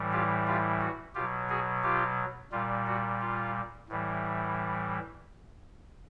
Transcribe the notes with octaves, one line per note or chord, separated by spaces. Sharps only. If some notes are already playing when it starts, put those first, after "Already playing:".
Already playing: A2 E3 G3
F4 G4
F4 G4
F#4
B2 F#3 F4 G4
F#4 G#4
F4 G4
A#2 G3 F4
F#4
F4
A2 E3 G3